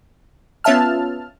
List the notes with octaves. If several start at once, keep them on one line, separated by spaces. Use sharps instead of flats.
B3 C#4 F4 E5 A5 F6